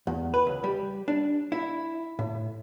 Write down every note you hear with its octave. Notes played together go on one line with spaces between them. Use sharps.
E2
B4
C#2
G3
D4
E4
A2